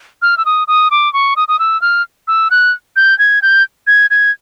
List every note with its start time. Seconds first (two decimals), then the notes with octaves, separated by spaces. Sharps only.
0.22 F6
0.38 E6
0.46 D#6
0.68 D#6
0.91 D6
1.13 C#6
1.36 D#6
1.48 D#6
1.59 E6
1.82 F6
2.28 E6
2.51 F#6
2.96 G6
3.19 G#6
3.42 G6
3.87 G#6
4.11 G#6